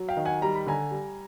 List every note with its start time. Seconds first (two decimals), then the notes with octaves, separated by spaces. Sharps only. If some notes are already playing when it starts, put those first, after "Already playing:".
Already playing: F#3
0.08 F5 G5
0.17 D#3
0.25 F#5 G#5
0.42 G3 A#5
0.55 B5
0.66 D3 G#5 A#5
0.91 G3